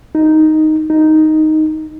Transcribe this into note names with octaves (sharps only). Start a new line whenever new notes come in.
D#4
D#4